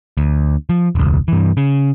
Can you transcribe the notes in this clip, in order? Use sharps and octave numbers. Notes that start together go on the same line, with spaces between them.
D2
F3
E1 C#2
G2 E3
C#3